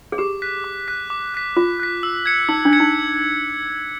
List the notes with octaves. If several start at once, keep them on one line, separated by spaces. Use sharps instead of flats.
G#4
G4 D6
F#6 B6
D6
F#6 B6
D6
F#6 B6
F4 D6
F#6 B6
E6
G#6 C#7
D#4 E6
D4
G#6 C#7
D#4